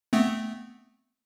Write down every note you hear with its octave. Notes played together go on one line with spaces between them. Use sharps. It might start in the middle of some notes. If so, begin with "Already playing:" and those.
A3 B3 C4